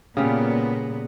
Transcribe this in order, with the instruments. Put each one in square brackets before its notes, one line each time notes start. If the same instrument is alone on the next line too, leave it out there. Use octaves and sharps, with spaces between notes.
[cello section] A#2 B3 [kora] C#3 G3 C#4